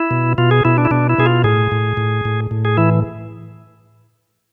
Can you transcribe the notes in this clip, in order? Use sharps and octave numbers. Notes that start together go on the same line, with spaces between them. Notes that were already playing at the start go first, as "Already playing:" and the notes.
Already playing: E4
B2
B2 F4
G#4
B2 E4
D4
E4
B2 D4
E4
B2 G#4
F4
A2 G#4
A2
A2
A2
A2
G#4
E3 E4